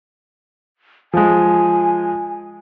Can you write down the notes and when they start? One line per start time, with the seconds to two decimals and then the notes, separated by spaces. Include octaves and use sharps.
1.13 F3 G#3 G#5